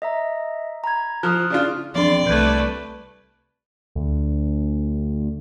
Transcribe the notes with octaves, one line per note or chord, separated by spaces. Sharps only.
D#5 E5 A#5
A#5 B5 G#6
F3 D#6 F6 F#6
C#3 D4 F4
E3 F3 C4 D4 D5 C6
C2 A3 B4 G6 G#6
D2